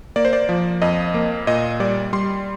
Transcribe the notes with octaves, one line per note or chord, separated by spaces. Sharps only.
A#3 D5
C5
D5
F3
F2 D#5
A#3
A#2 D#5
G3 D5
G3 C6